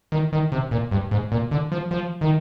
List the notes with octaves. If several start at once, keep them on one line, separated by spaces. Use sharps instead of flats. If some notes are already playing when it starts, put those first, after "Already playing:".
D#3
D#3
C3
A#2
G2
G#2
A#2
D3
F3
F3
D#3